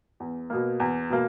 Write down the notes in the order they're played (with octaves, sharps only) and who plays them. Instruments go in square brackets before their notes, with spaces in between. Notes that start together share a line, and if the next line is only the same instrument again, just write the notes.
[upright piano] E2
B2 A#3
E2
B2 A#3